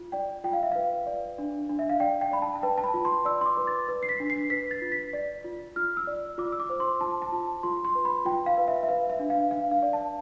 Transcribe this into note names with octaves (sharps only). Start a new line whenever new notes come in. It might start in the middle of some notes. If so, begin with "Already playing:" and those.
Already playing: F4
D5 G5
F4 G5
F5
E5
B4 F5
D5
D4
D4
E5
F5
D5 G5
G5
D5 B5
A5
A5
B4 G5
A5
B5
F4
C6
D5 E6
C6
D6
B4
A6
B4
C7
B6
D4
C7
B4 B6
A6
F4
B6
D5
F4
F4 F6
E6
D5
F4 D6
E6
D6
C5
C6
F4 A5
A5
F4
F4 C6
C6
B4
B5
F4 G5
F5
B4
E5
E5
B4 F5
E5
D4
F5
D4 F5
F5
D5
A5